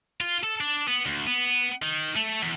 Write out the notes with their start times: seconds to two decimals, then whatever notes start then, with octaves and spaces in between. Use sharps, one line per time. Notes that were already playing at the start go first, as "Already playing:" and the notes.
0.21 F4
0.44 A4
0.61 D4
0.88 B3
1.06 D2
1.27 B3
1.82 D#3
2.16 A3
2.42 E2